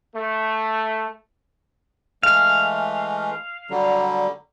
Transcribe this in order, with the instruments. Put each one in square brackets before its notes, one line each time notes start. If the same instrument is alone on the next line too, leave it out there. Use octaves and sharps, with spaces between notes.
[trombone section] A3
[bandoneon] E3 G#3 A3 [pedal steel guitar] F5
[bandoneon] D3 F#3 G3